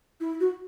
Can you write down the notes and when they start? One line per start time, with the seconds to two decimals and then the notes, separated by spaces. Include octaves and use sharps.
0.20 E4
0.40 F#4